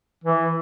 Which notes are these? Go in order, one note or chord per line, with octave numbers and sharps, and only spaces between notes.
E3